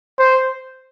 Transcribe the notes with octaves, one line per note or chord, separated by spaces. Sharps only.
C5